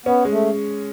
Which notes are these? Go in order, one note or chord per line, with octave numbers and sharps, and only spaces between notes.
B3 C#4
G#3
A3